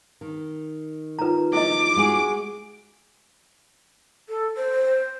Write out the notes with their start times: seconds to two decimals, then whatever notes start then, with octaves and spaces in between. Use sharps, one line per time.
0.21 D#3
1.19 D#4 F4 B4 A#5
1.53 E4 D#5 D6
1.96 G#3 F#4 G#4
4.29 A4
4.57 C5